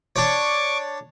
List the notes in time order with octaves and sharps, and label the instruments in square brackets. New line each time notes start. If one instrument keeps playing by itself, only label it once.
[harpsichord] D4 C#5 [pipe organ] C#6 D6